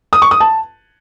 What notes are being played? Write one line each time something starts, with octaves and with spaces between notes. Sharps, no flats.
D#6
C#6
D#6
A5